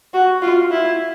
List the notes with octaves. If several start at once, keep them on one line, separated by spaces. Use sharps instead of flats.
F#4
F4
E4